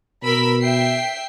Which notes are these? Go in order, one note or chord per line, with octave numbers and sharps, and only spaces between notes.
B2 A#4 B5 E6
E5 G5 C7